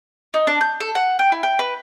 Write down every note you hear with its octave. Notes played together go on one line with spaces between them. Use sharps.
D#4
D4
G6
A4
F#5
G5
E4
G5
B4